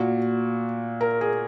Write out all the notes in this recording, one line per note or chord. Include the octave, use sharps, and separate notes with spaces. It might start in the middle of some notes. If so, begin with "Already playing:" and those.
Already playing: A#2 F#4
A#4
G#4